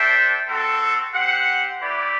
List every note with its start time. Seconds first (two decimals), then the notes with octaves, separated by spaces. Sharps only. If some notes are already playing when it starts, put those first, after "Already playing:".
Already playing: D4 A4 C5 E5 G5
0.46 C4 F#4 A4
1.13 C4 G4 C5 F#5
1.79 A3 E4 G4 B4 D5